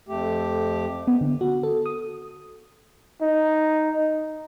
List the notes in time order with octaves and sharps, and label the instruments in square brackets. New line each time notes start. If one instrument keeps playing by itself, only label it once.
[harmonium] F2 A3 G4
[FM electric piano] B3
D3
F#4
A4
D#6
[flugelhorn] D#4